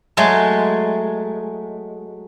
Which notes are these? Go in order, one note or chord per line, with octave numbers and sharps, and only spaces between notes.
F#3 G#3 A3